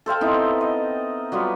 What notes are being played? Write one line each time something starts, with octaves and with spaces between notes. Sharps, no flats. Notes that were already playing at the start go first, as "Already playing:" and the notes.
A4 C5 F5 G5
B3 C4 D#4 E4
D#5
F#3 G3 B3 F4